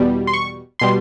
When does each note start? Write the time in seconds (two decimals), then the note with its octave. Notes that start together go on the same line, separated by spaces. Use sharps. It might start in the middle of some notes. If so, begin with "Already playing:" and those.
Already playing: E2 B2 G3
0.27 C6
0.33 C#6
0.79 B2 G3 C6